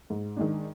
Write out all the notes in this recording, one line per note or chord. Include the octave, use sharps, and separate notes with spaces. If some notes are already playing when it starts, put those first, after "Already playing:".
G#2
D#3 G#3 D4